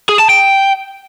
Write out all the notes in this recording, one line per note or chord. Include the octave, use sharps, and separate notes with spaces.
G#4
A5
G5